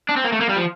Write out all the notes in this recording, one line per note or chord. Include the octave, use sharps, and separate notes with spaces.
D4
C4
A#3
A3
A#3
G3
F3